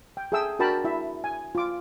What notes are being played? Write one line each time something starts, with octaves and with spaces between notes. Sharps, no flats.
G5
G#4 A4 E5 G5 E6
D4 F#4 A#4 G5 A5 B5
E4 E5
G#5
F4 D6